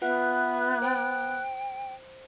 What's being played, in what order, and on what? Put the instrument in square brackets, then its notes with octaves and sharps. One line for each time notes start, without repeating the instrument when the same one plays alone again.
[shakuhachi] B3 [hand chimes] F4 B4 F#5 [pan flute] E5 [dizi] F#6
[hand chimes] C5 [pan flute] G5